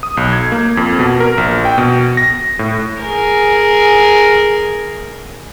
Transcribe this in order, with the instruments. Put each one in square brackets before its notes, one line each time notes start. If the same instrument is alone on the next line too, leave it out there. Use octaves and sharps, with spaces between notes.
[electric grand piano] D#6
B1
G#6
A#3
F2
B2
A#4
A#1
G5
B2
A#6
A2
[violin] G#4 A#4